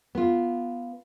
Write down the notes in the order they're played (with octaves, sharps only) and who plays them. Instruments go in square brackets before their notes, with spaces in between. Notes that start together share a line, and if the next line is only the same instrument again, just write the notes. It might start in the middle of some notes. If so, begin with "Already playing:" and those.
[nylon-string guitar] B3 F4